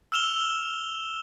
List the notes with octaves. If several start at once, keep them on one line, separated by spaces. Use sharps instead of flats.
E6 F6 E7 F7 G7